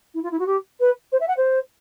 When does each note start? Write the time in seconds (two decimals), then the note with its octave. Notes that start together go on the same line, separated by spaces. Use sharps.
0.14 E4
0.23 F4
0.31 E4
0.39 F#4
0.46 G4
0.80 B4
1.12 C5
1.20 E5
1.28 F#5
1.37 C5